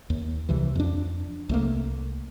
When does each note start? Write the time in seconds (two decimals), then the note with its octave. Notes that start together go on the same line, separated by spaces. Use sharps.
0.10 D#2
0.49 C2 C3 E3
0.75 F2 D4
1.49 C2 A3 A#3